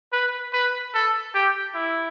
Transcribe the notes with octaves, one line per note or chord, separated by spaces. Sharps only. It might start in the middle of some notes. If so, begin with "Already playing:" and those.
B4
B4
A4
G4
E4